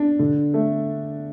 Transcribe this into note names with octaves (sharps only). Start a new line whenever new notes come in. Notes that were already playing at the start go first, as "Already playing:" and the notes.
Already playing: D4
D3
A3